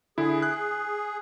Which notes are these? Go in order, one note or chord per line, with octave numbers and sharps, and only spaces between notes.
D3 E4 G#4
F#6